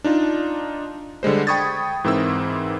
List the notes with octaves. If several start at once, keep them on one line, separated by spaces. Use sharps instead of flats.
D4 D#4 F4
D3 G3 G#3 C5
G5 B5 C#6 D#6 G#6 A6
G#2 E3 C4 E4 A#4 E6